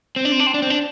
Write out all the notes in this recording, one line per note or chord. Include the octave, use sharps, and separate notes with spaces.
C4
D4
C4
D4
C4
D4
C4
D4